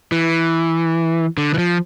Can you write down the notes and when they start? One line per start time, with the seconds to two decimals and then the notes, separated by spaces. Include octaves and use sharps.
0.12 E3
1.38 D3
1.54 E3
1.58 F3